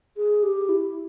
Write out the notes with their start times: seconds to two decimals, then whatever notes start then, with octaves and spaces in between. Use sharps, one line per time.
0.17 G#4
0.43 G4
0.69 E4